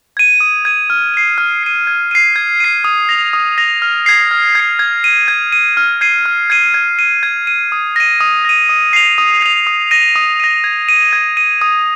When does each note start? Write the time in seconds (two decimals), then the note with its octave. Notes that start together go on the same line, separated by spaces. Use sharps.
0.17 G#6 D#7
0.40 D#6
0.65 G#6 D#7
0.90 F6
1.14 C7 D#7
1.38 F6
1.63 C7 D#7
1.87 G#6
2.11 C7 D#7
2.36 G#6
2.60 C7 D#7
2.84 D#6
3.09 A#6 F7
3.33 D#6
3.58 A#6 F7
3.82 F6
4.06 G#6 C7
4.31 F6
4.55 G#6 C7
4.79 G#6
5.04 D#7
5.28 G#6
5.52 D#7
5.77 F6
6.01 G#6 C7 D#7
6.26 F6
6.50 G#6 C7 D#7
6.74 G#6
6.99 D#7
7.23 G#6
7.47 D#7
7.72 D#6
7.96 A#6 D#7
8.20 D#6
8.45 A#6 D#7
8.69 D#6
8.93 C7 F7
9.18 D#6
9.42 C7 F7
9.67 D#6
9.91 A#6 D#7
10.16 D#6
10.40 A#6 D#7
10.64 G#6
10.89 D#7
11.13 G#6
11.37 D#7
11.61 D#6